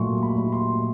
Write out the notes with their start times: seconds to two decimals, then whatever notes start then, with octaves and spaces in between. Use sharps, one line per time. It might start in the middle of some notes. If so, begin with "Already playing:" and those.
Already playing: A#2 F#3 A3 C6 C#6
0.23 B5
0.38 A#2
0.52 C6